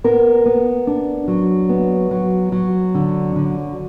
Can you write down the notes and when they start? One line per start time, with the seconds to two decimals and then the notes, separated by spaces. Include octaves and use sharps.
0.04 B3 A#4
0.46 B3
0.87 D4
1.28 F#3
1.69 B3
2.11 F#3
2.52 F#3
2.94 D3
3.36 D3